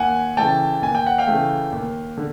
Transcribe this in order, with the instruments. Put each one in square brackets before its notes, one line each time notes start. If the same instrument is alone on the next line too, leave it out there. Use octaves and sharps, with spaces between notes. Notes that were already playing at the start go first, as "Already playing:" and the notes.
Already playing: [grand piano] D#2 F#5 G#5
C#3 E3 A3 G5 A5
D#2 G#5
G5
F#5
F5 G5
C#3 E3 A3
D#2
D3